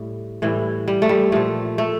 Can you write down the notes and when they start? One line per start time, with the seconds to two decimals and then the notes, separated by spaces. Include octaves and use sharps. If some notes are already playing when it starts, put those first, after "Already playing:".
Already playing: A2 G3
0.42 A2 E3 G3
0.88 G3
1.02 A3
1.09 G3
1.32 A#2 F3 A3
1.78 A3